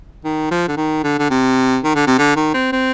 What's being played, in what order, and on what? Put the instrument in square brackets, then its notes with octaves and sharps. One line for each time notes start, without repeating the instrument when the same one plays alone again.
[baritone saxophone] D#3
F3
D3
D#3
D3
D3
C3
D#3
D3
C3
D3
D#3
C4
C4